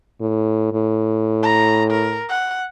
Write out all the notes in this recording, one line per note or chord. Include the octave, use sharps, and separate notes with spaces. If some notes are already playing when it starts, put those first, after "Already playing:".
A2
A2
A#5
A#4
F#5